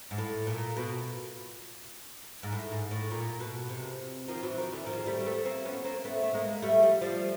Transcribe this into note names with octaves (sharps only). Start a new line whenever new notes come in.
G#2
A2
A#2
B2
G#2
A2
G#2
A2
A#2
B2
C3
D#3 F3
E3 F#3
D#3 F3
D3 E3
D#3 F3
G#3
G3 A3
C4
A3 B3
A#3 C4
B3 C#4
A#3 C4
A3 B3
A3
G#3 A#3
G3 A3
F3 G3
F3 G3